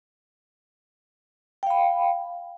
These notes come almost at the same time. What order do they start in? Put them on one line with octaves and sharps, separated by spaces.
G5 F5 B5